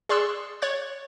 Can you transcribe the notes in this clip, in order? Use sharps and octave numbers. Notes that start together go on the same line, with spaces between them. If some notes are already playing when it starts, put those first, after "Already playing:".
G#4 D5 C6 C#6 E6 F#6
C#5 C#6 F#6 G#6 A6